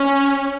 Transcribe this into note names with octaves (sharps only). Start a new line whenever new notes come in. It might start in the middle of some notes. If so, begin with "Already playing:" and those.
Already playing: C#4